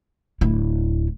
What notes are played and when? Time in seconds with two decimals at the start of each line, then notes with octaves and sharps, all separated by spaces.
0.41 D1 E4